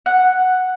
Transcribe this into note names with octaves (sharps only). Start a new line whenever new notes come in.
F#5